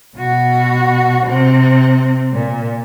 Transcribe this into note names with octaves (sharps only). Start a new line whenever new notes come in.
B2 F#4
C3 C4
A#2